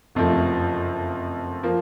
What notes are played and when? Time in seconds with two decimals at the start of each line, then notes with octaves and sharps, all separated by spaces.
0.15 F#1 F2 C3 F3 A3
1.63 F3 A#3